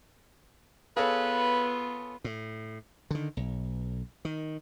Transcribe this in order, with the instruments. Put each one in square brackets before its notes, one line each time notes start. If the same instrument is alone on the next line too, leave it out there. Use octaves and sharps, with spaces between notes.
[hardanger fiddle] B3 F4 [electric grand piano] G#4 A4 C#5 [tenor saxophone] B4 [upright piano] F5
[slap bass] A2
D3 D#3
B1
D#3